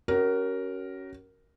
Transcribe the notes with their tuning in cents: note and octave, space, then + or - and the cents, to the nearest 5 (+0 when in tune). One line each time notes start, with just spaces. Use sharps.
C#4 +0 F#4 +35 A#4 +0